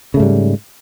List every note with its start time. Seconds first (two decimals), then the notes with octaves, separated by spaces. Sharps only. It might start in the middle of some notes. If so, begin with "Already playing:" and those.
0.14 C#3
0.17 A3
0.20 G#2
0.22 G3